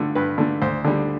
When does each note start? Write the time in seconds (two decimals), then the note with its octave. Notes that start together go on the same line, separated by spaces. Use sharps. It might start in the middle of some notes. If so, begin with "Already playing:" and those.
Already playing: G2 D3 A3
0.15 G2 B4
0.38 D3 A3
0.62 D2 C5
0.85 D3 G3